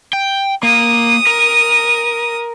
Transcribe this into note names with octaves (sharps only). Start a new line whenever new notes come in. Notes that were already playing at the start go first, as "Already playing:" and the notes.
G5
A#3 D#6
A#4